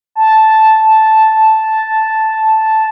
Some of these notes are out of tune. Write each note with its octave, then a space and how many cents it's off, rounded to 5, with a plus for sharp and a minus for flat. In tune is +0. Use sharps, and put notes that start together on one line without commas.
A5 -5